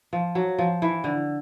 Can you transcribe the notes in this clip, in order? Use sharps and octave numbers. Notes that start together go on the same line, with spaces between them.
F3
F#3
F3
E3
D3